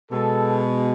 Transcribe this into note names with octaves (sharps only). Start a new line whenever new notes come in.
B2 G#3 A4